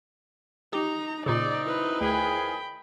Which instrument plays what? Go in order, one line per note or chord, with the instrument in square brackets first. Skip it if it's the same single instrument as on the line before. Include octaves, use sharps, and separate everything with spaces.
[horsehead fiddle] D#4 A#5 [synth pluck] G4
[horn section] F#2 C4 D#4 [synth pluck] A#2 C#3 [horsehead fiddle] D5
[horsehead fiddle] E4 B4
[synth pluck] D2 [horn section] D#3 F3 G#4 [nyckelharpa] G5 B5